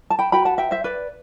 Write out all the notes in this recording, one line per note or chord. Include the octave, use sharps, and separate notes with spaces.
A5
G5 B5
F#4 B4 G5 B5
F#5 A5
E5 G5
C5 E5
B4 D5